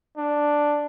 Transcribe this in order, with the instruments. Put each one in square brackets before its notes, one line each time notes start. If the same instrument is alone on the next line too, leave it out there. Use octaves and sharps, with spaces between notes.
[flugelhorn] D4